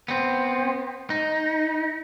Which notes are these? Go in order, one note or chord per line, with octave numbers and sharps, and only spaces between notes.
B3 C4
D#4